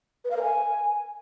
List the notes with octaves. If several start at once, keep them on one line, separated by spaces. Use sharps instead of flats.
B4
F5
A#4
G#5